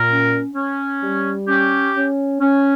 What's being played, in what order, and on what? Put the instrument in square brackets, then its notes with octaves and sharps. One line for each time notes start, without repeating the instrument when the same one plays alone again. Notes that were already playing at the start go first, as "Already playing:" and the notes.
Already playing: [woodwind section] A#2 A#4
C#4
C#4
G3
C#4 G4
C#4
C#4